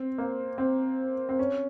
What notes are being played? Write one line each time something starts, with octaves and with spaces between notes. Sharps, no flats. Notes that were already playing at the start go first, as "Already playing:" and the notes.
Already playing: C4
A#3
C4
C4
C#4